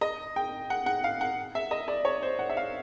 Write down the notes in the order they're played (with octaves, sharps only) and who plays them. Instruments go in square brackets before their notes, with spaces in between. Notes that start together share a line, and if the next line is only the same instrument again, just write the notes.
[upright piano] D#5
G5
F#5
F#5
F5
F#5
E5
D#5
D5
C#5
C5
F#5
E5
F5